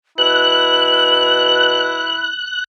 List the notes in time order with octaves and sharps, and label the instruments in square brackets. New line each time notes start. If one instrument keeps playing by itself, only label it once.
[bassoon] B2 [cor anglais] E4 [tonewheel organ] F#6 [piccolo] F#7